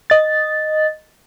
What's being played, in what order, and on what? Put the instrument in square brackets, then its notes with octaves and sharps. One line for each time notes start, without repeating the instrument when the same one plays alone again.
[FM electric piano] D#5 A6